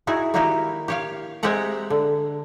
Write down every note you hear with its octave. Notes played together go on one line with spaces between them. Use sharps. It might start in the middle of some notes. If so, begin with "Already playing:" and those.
D#4 E4 F#4 G#4
D#3 A#3 D#4 E4 F#4 G4
G4 C#5 F5
G#3 C4 G4 E5 F#5 A#5
D3